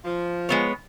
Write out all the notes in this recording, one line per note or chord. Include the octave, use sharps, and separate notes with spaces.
F3
G#3 B3 C#5